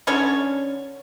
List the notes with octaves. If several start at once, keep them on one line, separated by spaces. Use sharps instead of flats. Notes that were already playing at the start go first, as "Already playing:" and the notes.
D3 C#4 A4 C#5